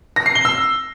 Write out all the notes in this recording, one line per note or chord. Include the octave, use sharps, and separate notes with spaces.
A#6
C7
G7
E6